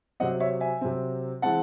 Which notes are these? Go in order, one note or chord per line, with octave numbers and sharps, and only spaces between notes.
C3 F#3 C4 D#5 F#5
C#5 E5
E5 G#5
C3 F#3 C4
E3 G#3 C4 F#5 A5